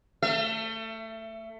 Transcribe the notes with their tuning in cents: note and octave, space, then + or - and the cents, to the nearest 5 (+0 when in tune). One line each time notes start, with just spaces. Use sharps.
A3 +20 E5 +45